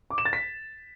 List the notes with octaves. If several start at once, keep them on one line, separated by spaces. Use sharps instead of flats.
D6
E7
A6
B6